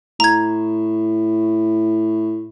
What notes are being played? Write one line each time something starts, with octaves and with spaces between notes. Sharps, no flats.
A2 A#5 G#6